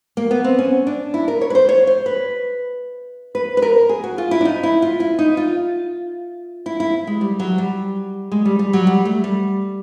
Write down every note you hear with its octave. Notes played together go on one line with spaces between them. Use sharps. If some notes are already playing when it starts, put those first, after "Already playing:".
A#3
B3
C4
C#4
D4
E4
A#4
C#5
B4
C5
C#5
C5
B4
B4
B4
A#4
G#4
F#4
F4
E4
D4
D#4
E4
F4
E4
D#4
F4
E4
E4
G#3
G3
F#3
G3
G#3
G3
G3
F#3
G3
A3
G3